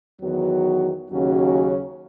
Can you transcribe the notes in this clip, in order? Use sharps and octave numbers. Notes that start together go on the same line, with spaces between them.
E2 D#3 F#3 B3 F#4
D#2 C#3 F#3 C#4 F#4